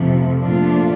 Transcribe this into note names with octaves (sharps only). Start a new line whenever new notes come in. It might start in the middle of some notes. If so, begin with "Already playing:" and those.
Already playing: F2 C3 F3 A3
A#2 F3 A3 D4 F4